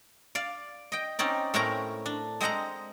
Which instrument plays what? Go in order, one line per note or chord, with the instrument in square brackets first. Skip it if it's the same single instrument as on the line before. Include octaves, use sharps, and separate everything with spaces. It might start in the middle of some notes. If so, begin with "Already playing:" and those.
[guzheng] D5 F5
D#5 G5
C4 C#4 D#4 D5
A2 A3 C4 C#4 A#4 A#5
D4
G#3 C4 D#5 F#5 A#5